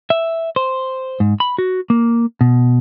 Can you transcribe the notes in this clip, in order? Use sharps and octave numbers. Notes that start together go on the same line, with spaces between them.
E5
C5
G#2
B5
F#4
A#3
B2